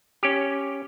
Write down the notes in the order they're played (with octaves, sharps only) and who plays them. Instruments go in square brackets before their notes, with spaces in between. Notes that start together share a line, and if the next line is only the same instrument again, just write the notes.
[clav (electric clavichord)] C#4 G4